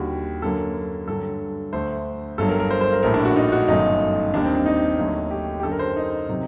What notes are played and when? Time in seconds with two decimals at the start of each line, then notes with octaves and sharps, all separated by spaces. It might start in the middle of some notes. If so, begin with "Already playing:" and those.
Already playing: D#2 D3 G3 F#4
0.42 F#2 D3 F#3 A#3 A4
1.08 G2 D3 F#3 A4
1.73 D2 D3 A3 C5
2.38 G1 G2 F#3 A4
2.49 A#4
2.60 A#4
2.71 C5
2.81 C5
2.93 A#4
3.03 A#1 A2 A3 A#4
3.14 D4
3.25 F#4
3.36 D#4
3.52 F#4
3.68 G1 F#2 D#3 A3 D#4
4.34 D#2 D#3 G3 D4
4.44 C4
4.55 D4
4.66 D#4
4.98 D#2 D3 F#3 A3
5.31 G4
5.60 G4
5.63 F#2 D3 F#3 A4
5.72 A#4
5.79 C5
5.96 D#4
6.29 C3 F#3